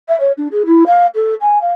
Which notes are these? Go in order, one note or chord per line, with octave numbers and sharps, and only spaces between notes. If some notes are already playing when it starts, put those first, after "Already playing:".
E5
C#5
D4
G#4
E4
F5
A4
G#5
F5